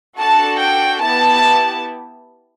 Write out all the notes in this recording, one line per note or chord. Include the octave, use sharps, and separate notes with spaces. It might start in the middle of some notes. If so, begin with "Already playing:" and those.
D4 F#4 A4 A5
G5
B3 E4 G4 A5